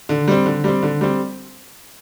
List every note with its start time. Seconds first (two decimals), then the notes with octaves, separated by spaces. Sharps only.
0.09 D3
0.28 G3 C4
0.46 D3
0.64 G3 C4
0.83 D3
1.01 G3 C4